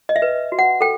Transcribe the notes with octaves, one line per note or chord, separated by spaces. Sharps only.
D#5
E5
B4
F#4
F#5
A4 G5